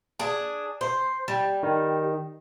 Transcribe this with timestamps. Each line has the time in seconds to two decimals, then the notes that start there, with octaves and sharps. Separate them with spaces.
0.19 D4 G#4
0.81 C5
1.28 G3
1.63 D#3